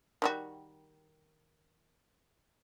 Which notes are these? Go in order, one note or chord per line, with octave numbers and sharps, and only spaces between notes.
D#3 G3 F#4